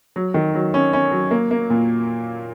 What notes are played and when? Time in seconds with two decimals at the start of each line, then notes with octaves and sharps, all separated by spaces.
0.16 F#3
0.34 D#3
0.55 F#3
0.74 C#4
0.93 C#4
1.11 F#3
1.31 A#3
1.51 A#3
1.70 A#2